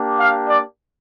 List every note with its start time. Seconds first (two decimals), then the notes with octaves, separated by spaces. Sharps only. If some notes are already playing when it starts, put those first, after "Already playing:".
Already playing: A#3 D4 G4
0.19 F5
0.49 D5